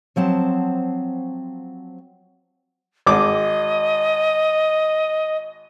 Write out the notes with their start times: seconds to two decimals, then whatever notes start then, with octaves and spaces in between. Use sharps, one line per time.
0.16 F3 F#3 C4 A5
3.06 G#1 D#5 D6